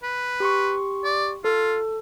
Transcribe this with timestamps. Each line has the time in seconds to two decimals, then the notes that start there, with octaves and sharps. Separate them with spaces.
0.03 B4
0.40 G4 C6 C#6
1.05 D5
1.44 F4 A4